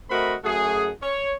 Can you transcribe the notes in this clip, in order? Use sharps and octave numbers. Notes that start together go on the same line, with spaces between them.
A3 C4 F#4 A#4 D#5 B5
F#2 A3 F#4 G#4
C#5